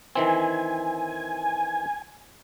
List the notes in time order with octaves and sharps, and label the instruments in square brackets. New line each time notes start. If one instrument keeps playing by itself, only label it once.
[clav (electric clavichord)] D#3 E3 C4 [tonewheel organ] G#5